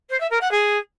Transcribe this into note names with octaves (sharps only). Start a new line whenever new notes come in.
C5
E5
A#4
F#5
G#4